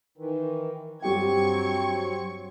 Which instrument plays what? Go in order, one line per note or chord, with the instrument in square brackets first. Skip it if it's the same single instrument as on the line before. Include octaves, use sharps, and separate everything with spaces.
[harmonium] D#3 E3
[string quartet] G2 C#6 G#6 [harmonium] F#3 C4 [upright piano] G3 G4 G5